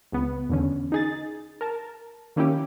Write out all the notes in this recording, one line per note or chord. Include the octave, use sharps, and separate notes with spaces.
C#2 B3
E2 D3 C#4
D#4 G#4 A6
A#4 A5
D#3 A#3 C#4 E4 G4